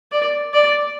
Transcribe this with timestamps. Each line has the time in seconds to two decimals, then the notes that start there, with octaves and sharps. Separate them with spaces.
0.12 D5
0.54 D5